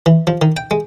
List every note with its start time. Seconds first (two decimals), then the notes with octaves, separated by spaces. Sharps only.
0.06 E3
0.27 F3
0.42 D#3
0.57 G5
0.71 G#3